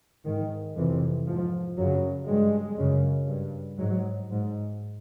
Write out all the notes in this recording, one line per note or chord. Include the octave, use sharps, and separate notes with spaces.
G#2 D#3
F2 C3 E3
G#2 F3
F#2 C#3 F#3
G2 G#3
F#2 C#3
G2
G#2 F#3
G#2